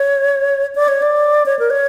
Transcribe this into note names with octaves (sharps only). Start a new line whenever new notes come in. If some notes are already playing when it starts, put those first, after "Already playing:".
Already playing: C#5
D5
C#5
D5
C#5
A#4
C#5